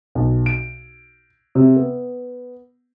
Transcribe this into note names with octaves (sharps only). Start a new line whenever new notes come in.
B1
D7
C3
B3